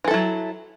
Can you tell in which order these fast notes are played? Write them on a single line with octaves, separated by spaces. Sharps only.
E3 A4 E4 F#3